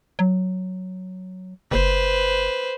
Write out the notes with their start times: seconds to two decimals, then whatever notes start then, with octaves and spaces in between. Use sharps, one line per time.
0.19 F#3
1.71 F#1 B4 C5